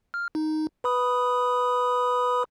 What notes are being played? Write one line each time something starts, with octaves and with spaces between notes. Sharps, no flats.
F6
D#4
B4 B5 D#6